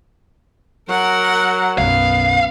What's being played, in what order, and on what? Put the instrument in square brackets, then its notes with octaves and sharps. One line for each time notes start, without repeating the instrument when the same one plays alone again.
[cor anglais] F#3 [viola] A#4 F#5
[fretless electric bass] B1 F#2 [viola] B3 [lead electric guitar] F5